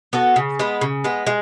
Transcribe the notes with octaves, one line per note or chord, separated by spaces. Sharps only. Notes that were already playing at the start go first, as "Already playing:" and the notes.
B3 F#4 A4
C#3
G#3 B3
C#3
G#3 B3
G#3